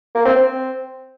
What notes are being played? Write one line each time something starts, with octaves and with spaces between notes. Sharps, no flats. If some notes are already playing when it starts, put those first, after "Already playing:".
A#3
C4
C4